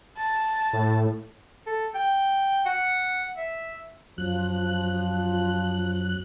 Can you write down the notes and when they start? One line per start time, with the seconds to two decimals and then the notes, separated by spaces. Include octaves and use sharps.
0.18 A5
0.73 A2
1.67 A4
1.95 G5
2.66 F#5
3.37 E5
4.18 F#2 F3 F#3 F#6